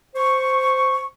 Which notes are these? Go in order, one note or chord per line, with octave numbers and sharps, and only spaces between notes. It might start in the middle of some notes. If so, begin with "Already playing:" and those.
C5 C#6